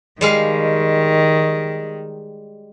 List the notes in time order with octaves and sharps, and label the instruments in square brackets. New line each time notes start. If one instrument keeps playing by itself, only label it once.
[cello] D#3 [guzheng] G3 G#3 F5